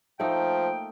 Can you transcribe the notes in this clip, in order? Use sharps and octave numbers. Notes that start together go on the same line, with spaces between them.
F3 A3 A#3 D#4 G5